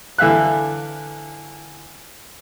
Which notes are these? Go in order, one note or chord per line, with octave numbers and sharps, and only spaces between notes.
D3 E3 E5 F5 F#6